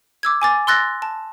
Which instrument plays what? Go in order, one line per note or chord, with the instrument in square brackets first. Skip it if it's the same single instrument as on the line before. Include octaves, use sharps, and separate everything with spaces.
[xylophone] D6 E6 G#6
G#5 D6 A6
C6 E6 F#6 A6 A#6
A5